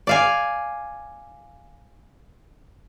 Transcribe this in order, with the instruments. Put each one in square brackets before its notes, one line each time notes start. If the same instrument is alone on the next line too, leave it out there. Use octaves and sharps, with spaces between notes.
[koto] D5 F5 G#5